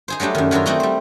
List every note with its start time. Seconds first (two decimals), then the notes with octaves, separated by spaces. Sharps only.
0.08 D#4 G#4 C5
0.20 F#3 G3 A3 D4 G4
0.35 F#2 D#3
0.51 D#3 F#3 D4 E4 F4
0.66 A3 C4 D#4 F#4
0.80 G3 C5